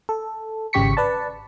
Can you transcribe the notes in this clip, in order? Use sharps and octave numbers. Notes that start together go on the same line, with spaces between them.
A4
G#1 C#3 G4 C#6 B6 C#7
B4 D5 A5